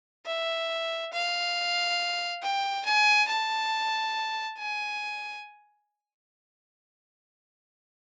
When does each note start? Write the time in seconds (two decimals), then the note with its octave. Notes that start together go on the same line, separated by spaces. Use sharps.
0.26 E5
1.13 F5
2.42 G5
2.85 G#5
3.28 A5
4.58 G#5